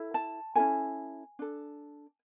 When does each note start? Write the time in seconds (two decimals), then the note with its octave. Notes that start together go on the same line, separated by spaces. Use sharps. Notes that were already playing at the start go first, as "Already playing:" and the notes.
Already playing: E4 A4
0.14 A5
0.55 C#4 E4 A4 G#5
1.39 D4 A4